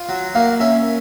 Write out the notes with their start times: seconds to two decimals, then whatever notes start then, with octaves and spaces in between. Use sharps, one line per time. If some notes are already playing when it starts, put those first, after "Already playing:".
Already playing: F4
0.09 F#3
0.35 A#3 F5
0.60 C#4 E5